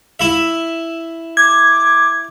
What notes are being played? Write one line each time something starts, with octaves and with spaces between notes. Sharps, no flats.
E4 E5
D6 G#6